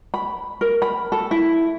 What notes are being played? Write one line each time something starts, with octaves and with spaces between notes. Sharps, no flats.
B5
A#4
B5
A4
E4